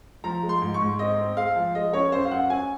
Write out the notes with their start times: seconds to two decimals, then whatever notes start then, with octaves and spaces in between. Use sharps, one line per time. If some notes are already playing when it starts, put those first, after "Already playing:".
0.24 F3 A#5
0.43 G#3
0.49 C6
0.62 G#2
0.74 C#6
0.81 G#2
0.99 C4 D#5
1.18 C4
1.37 G#3 F5
1.56 F3
1.75 G#3 D#5
1.93 C#4 C#5
2.12 F#2 C5
2.25 F5
2.31 F#2 F#5
2.50 C#4 G#5